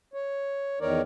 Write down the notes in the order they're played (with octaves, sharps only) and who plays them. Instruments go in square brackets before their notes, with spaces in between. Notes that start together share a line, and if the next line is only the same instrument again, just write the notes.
[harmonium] C#5
E2 D#3 A#4 C#5 D5